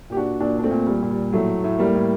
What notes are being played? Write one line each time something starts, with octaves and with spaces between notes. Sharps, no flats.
A#2 G4
D4 F#4
A#2 D4 F#4
D4
A3 C4
A#2
G3
A#2
G3
A2 F#3 A3
A2
G3 A#3
A2